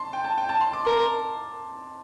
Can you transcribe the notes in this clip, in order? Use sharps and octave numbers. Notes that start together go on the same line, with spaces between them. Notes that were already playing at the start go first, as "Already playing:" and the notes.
Already playing: A5 C6
G5
A5
G5
A5
C6
D6
A#4 C6